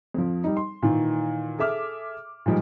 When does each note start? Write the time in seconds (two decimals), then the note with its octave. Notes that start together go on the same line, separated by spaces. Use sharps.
0.14 F2 F3
0.44 G3 D#4
0.57 C6
0.82 A#2 D#3 E3
1.59 G#4 A4 E5 D6 F6
2.46 A#2 D#3 F3 G3 G#3